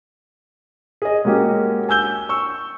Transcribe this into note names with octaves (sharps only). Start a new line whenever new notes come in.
G#4 D#5
G#3 A#3 C#4 F#4 G4
G#5 E6 G6 G7
C#6 E6